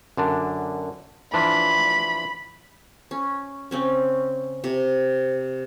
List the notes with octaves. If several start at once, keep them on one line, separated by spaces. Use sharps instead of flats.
F#2 D3 D4
E3 F3 D4 B5
C#4
C#3 C4 C#4
C3